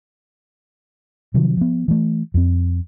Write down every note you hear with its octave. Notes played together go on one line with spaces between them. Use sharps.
C3 D#3 F3 F#3
F3 B3
E3 A3
F2 C4